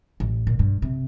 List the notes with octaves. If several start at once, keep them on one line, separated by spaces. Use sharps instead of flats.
A1
A#2
G2
C3